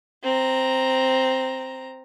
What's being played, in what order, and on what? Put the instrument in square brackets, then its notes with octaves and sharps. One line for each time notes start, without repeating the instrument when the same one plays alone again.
[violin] C4 A#5